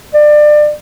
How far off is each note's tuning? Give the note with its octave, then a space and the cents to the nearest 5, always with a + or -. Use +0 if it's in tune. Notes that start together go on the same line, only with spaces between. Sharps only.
D5 +25